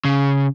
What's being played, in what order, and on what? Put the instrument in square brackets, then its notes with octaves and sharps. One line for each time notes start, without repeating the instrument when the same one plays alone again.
[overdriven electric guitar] C#3